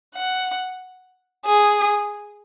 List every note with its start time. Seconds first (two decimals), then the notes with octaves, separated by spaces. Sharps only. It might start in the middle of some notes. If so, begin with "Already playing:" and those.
0.15 F#5
1.45 G#4